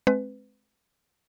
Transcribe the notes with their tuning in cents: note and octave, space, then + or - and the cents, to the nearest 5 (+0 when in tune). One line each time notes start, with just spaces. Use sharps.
G#3 +40 C4 +10 B4 +25